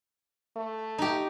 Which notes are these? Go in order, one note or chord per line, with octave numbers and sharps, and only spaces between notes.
A3
D#4 G4